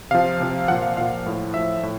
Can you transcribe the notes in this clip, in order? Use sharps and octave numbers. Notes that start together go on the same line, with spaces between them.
C3 F3 F5
C3 F3
A#2 F3 F#5
F5
A#2 F3 F5
A2 F3
A2 F3 E5
A2